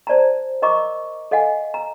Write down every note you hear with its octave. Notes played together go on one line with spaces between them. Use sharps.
C5 D5 A5 A#5
A#4 D#5 A#5 C#6 D6
A4 D#5 F5 F#5 G#5
A#5